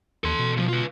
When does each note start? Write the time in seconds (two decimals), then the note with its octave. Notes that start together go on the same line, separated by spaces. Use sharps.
0.24 D#2 A4 C6
0.39 B2
0.57 D2 F3
0.69 F4 B4